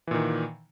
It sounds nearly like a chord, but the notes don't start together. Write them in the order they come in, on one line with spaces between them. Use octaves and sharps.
E3 A#2 D#3